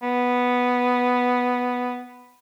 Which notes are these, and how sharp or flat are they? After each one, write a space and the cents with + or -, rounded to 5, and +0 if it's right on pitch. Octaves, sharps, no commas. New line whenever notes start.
B3 +0